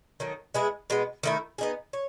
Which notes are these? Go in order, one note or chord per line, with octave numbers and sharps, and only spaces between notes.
D#3 F#3 A3
G#3 B3 E4 G#4
B2 G#3 B3
D#3 A3 E4
B3 D#4 G#4
C#5